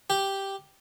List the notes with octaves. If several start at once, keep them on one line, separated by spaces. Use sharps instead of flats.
G4